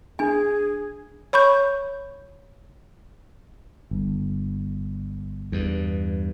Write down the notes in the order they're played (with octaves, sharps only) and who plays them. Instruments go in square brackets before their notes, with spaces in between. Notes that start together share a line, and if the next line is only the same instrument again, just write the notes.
[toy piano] D4 G#5 [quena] G#4
[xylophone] C#5 B5 C#6 G6
[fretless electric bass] G1
[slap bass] E2 G2